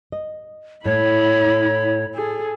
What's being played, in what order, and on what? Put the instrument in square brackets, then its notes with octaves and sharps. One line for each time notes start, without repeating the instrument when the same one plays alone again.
[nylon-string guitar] D#5
[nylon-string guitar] A2 [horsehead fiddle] E4 B5 [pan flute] C#5
[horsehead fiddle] G#4 A4